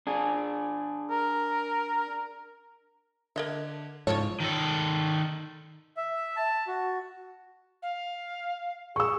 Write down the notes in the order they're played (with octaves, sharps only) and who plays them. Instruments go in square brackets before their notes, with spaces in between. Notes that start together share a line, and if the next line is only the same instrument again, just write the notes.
[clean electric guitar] D4 G#4
[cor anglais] A#4
[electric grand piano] D3 G#6 [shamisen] A#4 D#5 E5
[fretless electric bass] G#2 [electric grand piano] C#3 F3 [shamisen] E3 F4 A4 [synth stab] C#5
[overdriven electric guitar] D#3 A4
[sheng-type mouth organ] E5
A5
F#4
[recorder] F5
[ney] G#4 [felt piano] C#6 E6